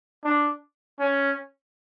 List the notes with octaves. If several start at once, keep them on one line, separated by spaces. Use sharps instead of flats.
D4
C#4